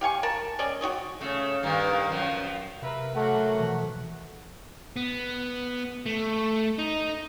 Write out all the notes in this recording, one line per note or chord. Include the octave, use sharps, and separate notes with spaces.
G4 F5 G#5 C#6
A#4 A5
C#4 G#4 D5 D#5
F#4 G4 C#5 D#5
C#3 A3
G2 D#3 A#3
F#2 F3
C3 A#4 B4 E5
F#3 A3 A#3 F#5
B2 E3 F3
B3
A3
D#4